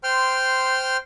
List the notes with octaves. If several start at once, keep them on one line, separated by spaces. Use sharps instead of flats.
C5 G5 C6 F6